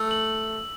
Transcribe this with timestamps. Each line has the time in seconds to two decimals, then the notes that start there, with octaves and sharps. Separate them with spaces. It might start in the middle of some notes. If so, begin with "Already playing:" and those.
Already playing: A3 E6
0.11 F#7